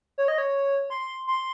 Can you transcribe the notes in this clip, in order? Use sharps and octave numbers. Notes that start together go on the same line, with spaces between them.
C#5
D#5
C#5
C6
C6